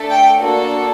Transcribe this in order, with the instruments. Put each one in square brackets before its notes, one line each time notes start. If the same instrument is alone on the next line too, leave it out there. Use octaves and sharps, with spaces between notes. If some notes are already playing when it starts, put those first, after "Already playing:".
Already playing: [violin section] A3 D4 A4
G5
A#3 D4 F#4 A4